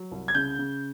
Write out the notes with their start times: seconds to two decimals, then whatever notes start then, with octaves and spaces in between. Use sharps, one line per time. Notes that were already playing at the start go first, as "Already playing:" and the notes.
Already playing: F#3
0.11 C2
0.28 G#6
0.35 C#3 G6
0.59 C#3